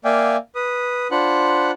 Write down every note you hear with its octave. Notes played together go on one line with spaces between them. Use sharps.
A#3 D5 E5 F5 G5 G#5
B4 D#6
D4 F4 C5 F#5 B5 F#6